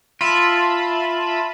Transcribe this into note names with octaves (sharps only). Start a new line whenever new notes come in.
F4 E5 A5 B5